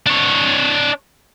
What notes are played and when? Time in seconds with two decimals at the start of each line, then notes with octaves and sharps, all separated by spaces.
0.07 D4 C#5